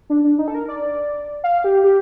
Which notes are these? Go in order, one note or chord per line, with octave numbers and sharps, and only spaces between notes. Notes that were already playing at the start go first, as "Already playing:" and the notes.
D4
D4
D#4
A4
A#4
D5
F5
G4
G4